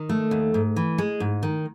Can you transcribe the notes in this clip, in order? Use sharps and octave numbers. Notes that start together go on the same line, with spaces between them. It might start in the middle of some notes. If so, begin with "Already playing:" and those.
Already playing: D#3
A3
D#2
G#2
E3
G#3
G#2
D#3